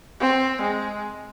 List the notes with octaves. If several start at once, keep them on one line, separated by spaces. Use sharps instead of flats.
C4
G#3